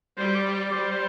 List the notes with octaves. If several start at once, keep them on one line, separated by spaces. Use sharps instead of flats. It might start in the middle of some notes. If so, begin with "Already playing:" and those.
G3 C5
D5
D5
G3 C5
C5